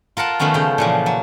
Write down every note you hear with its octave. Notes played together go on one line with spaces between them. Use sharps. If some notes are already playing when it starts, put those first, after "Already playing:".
F4 A#4 F#5 A5
D#3 F3 A3 B3 C#4
C#3 G5
A#2 E3 F3
F#3